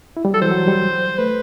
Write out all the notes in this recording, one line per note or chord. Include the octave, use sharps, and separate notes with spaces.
E4
G3
F#3 A4
E3 C5
F#3
G3
A3 B4